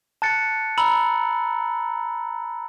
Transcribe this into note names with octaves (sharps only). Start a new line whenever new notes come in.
A5 F#6 A6 C#7
A#5 B5 E6 F#7